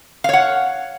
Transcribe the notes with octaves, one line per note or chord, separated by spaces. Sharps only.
C#5 F5 F#5